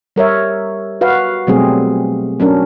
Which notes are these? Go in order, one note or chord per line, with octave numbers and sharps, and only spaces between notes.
G3 A#4 C#5 E5
F#4 B4 F5
B2 F#3 G3 A3 C4 G#4
F#3 C#4 D4 A#4